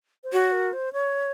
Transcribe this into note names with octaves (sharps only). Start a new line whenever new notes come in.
C5
F#4 C#5
A#4
C5
C#5